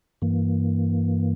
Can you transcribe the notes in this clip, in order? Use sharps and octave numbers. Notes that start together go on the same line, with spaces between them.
G2 E3 A#3